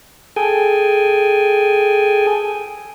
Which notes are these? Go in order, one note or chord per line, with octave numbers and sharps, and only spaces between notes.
G#4 A4 G5 G#5